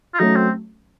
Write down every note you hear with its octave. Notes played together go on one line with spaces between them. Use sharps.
F4
F#3 A3 C#4 D#4
C4